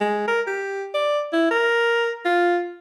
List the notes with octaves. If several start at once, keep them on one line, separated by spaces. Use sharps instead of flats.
G#3
A#4
G4
D5
E4
A#4
F4